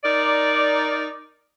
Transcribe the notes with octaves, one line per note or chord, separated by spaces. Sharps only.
D#4 A#4 D5